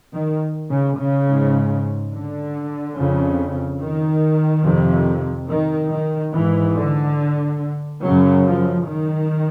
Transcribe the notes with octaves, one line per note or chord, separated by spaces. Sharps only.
D#3
C#3
C#3
G#2
D3
F2 C#3
D#3
F2 C3
D#3
D#3
G#2 E3
D3
F#2 C#3 F#3
F3
D#3